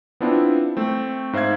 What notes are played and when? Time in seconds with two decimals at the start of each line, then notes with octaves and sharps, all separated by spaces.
0.21 B3 C4 D4 E4 F4
0.77 A3 C4
1.33 G#2 C5 E5 F5 G#6